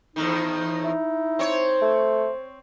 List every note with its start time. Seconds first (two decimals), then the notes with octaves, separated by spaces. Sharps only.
0.16 E2 A2 D#3 D#4
0.84 E4
1.39 C4 C5 C#5
1.82 A3